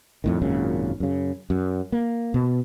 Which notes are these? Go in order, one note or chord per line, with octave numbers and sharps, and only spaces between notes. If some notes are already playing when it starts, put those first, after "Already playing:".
F2 A2 D#3
G#1 F#2 A#2 C#3
F#2 C#3
F#2
A#3
B2